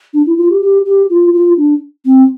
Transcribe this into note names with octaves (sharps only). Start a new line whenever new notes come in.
D4
E4
F4
G4
G4
G4
F4
F4
D4
C4